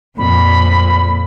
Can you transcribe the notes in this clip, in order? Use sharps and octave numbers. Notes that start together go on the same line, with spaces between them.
F2 A#2 B5